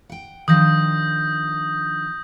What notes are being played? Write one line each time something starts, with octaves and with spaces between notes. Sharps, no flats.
F#5 G5
D#3 F3 D4 D#6 G6 A#6